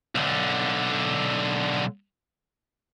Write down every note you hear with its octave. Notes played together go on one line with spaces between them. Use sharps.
B1 D3